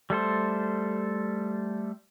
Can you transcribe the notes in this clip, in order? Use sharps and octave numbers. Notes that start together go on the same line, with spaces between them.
G3 A3 A4 C5